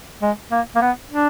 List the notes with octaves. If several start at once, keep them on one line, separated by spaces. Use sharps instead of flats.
G#3
A#3
A#3
B3
D4